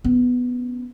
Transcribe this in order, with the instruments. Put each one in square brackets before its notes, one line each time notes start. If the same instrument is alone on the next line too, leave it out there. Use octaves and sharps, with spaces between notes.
[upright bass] B3 C#4